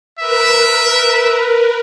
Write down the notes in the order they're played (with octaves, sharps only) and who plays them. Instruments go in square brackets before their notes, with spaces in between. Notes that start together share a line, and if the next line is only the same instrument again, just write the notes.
[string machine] A#4 B4 [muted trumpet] E5